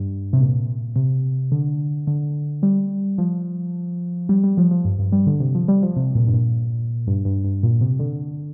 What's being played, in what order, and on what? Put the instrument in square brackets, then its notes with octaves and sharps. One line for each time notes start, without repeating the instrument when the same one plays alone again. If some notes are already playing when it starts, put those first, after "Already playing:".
Already playing: [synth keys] G2
C3
A#2
C3
D3
D3
G3
F3
G3
G3
F3
F3
G2
G2
G3
D3
C3
F3
G3
F3
C3
A#2
G2
A#2
G2
G2
G2
A#2
C3
D3